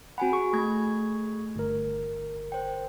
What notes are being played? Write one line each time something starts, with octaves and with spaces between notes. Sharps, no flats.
C4 F#4 F#5 G#5 B5
G#4 C#6
A3 G#6
G1 A#4
C5 G5